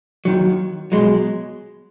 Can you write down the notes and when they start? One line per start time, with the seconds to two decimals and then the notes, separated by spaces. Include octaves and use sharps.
0.25 D#2 D#3 F#3
0.92 B2 F#3 G#3